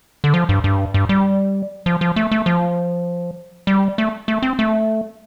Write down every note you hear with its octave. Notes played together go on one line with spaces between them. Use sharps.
D3
F3
G2
G2
G2
G3
F3
F3
A3
A3
F3
G3
A3
A3
C4
A3